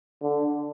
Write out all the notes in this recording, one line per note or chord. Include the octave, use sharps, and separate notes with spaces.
D3